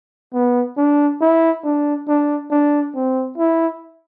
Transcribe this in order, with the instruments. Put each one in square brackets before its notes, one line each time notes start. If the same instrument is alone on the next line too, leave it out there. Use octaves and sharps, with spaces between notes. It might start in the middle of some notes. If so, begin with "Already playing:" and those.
[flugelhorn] B3
D4
E4
D4
D4
D4
C4
E4